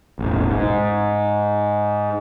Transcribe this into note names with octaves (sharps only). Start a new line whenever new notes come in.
E1 A1
G#2